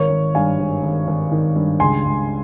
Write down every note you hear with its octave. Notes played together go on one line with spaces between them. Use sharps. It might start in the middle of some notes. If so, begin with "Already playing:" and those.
Already playing: G#1 A#4 C#5
G#1
G2 F5 G#5
G#1
G#1
G#1
D#3
G2
C#2 G#5 C6
C#2